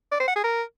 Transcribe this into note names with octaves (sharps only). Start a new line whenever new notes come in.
D5
C5
F#5
G#4
A#4